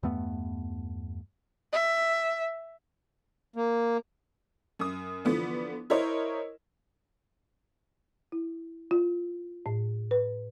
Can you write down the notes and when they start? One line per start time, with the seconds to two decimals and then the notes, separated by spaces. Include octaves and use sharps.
0.03 E2 G2 A3 B3
1.73 E5
3.56 A#3
4.79 F#2 D#6
5.25 D3 E3 F3 B3
5.90 E4 A#4 C5 C#5 D#5
8.32 E4
8.91 F4
9.66 A2
10.11 B4